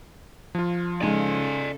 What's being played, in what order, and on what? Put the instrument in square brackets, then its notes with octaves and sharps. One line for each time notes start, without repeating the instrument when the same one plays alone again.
[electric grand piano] F3 F4
[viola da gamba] C#3 A4 [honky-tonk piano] G#3 D#4 [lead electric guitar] D5 G#5